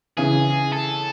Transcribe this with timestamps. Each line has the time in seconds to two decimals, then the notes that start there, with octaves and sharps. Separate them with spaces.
0.17 C#3 E3 G#4
0.72 A4